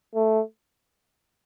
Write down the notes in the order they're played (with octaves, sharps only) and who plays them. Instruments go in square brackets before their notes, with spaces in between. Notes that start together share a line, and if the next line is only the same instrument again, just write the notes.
[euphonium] A3